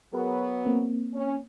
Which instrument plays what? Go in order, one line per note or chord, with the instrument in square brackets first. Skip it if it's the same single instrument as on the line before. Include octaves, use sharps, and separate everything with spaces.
[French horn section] F#3 B3 [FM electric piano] G#4 A#4 B4
[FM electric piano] A#3 C4
[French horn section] C#4